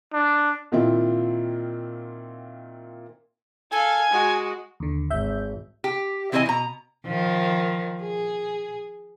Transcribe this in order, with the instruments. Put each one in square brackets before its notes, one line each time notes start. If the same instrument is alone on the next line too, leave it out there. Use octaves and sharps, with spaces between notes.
[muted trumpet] D4
[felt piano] A#2 D#3 C4 E4 F4
[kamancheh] A4 F5 [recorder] G#5
[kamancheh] G#3 F#4
[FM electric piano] D#2 D3
[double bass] G#1 [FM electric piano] E5 G6
[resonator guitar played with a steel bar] G4
E3 C4 E4 B4 D#5 G#5
B2 A#5
[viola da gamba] D#3 F3
G#4